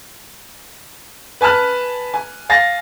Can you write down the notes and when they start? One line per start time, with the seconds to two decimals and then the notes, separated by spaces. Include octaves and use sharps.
1.41 B4 G#5 A5 F6 F#6
2.14 G#5
2.49 F5 G#5 A6 A#6